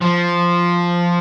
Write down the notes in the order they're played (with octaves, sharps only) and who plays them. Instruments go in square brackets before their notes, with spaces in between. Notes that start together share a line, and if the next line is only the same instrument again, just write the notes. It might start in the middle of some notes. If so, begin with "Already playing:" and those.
[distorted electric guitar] F3